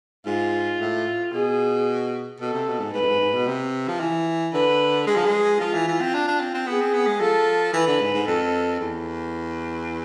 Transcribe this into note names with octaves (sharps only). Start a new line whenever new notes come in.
G#2 F4
A2
B2 G#4
B2 A4
C3
B2
G#2
G#2 B4
F2
G#2
G#2
B2
C3
F3
E3
D3 B4
G#3 G#4
F3
G#3
F3 F4
E3
E3
C4
D4
D4
C4
C4
B3 G#4
C4
B3
G#3
F3 A4
E3 B4
D3
G#2
G#2
F2 A4
E2